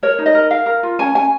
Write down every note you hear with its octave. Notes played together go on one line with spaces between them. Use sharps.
A#4 C#5
D#4
D#5
A#4
A#4 F5
A#4
F4
C#4 G#5
C#4 G#5